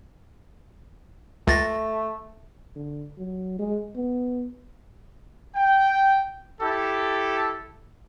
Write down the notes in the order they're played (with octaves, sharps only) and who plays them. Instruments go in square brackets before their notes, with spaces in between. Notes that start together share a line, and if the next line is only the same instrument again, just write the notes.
[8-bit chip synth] C#2 A6 A#6 [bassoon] A3
[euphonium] D3
F#3
G#3
B3
[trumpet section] G5
E4 G4 A4